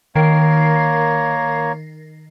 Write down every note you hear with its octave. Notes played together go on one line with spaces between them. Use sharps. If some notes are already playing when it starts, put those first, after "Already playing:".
D#3 A#3 A#4 C#5 A#5 C7